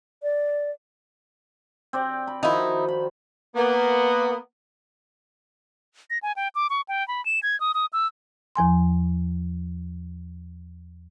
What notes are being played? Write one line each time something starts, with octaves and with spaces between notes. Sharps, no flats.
D5
C4 D5 G5
B5
D#3 F3 D#4 E4 F#4
B5
A#3 B3
A#6
G#5
G5
D6
C#6
G5
B5
E7
G#6
D#6
D#6
E6
E2 F3 G#5 C6